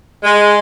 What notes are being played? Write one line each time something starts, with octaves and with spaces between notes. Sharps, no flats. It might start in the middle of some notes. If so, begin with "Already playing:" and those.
G#3